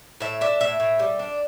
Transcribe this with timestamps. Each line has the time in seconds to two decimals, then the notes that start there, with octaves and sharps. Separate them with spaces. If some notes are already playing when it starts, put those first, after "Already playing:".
0.20 A2 E5
0.41 D4 E5
0.60 A2 E5
0.80 A2
0.99 G3
1.19 D4